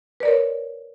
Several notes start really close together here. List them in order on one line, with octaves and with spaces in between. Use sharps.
B4 D5 A#4 C#5